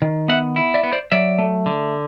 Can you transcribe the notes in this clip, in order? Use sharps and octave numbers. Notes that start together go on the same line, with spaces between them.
D#3
B3 E5 F#5
E4
D5 E5
B3
C5 D5
F#3 D5 E5
A3
D3